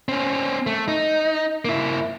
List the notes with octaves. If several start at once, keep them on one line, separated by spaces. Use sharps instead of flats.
C4 C#4
A3
D#4
A#3 E4